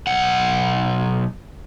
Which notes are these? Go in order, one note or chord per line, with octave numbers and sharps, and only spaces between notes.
B1 F#5